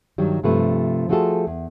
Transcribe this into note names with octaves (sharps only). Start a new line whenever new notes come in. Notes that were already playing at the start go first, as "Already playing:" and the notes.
G2 D#3 F#3 G3
G2 C3 F3 A3 B4
F3 A3 F4 F#4 G#4 A4
E2